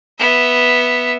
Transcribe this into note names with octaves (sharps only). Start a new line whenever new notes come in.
B3 E5